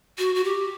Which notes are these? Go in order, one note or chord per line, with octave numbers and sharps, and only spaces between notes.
F#4
F#4
G4